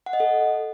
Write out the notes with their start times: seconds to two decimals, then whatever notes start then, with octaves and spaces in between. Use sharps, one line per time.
0.06 F#5
0.13 D#5
0.20 A4